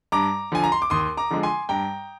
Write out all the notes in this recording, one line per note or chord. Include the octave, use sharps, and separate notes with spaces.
G2 A#5 D6
D3 F3 G#5
A#5
C6
D6
D#2 C6 D#6
A#5 D6
D3 F3 G#3
G#5 C6
G2 G5 A#5